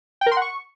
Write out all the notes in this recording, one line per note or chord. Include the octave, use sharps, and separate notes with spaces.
G5
A#4
C6
F#5
C#6